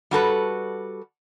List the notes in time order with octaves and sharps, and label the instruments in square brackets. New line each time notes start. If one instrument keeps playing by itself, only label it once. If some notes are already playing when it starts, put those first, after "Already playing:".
[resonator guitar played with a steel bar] G3 F#4 A4 B4